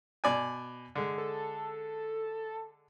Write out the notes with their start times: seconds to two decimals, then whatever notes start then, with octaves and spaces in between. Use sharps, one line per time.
0.24 B2 D5 G#5
0.95 D3 G#3
1.18 A4